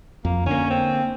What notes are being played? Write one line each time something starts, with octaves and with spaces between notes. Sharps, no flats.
F2 A#3
D3 A#3 C#4
C4